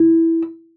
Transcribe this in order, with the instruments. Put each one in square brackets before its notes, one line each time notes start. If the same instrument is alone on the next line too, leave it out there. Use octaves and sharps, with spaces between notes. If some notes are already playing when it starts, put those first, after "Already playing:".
Already playing: [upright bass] E4